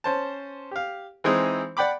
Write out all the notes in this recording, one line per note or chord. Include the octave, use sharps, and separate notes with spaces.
C#4 C5 A5
G4 F5
E3 G#3 C4 D#4
D5 F#5 G5 B5 D6